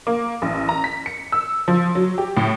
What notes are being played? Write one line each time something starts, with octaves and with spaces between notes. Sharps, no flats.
A#3
A1
A#5
B6
C#7
E6
F3
F#3
G4
A2